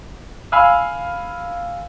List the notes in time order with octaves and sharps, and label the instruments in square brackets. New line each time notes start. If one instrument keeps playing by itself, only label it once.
[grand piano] F5 G#5 B5 E6 F6